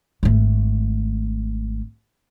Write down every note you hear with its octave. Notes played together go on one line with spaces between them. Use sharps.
G#1 A3